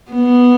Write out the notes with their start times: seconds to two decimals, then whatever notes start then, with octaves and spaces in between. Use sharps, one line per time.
0.12 B3